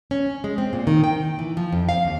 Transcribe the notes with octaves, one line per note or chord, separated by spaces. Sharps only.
C#4
G#3
C4
A#2
D#3
G5
E3
F3
F2
F5
D#2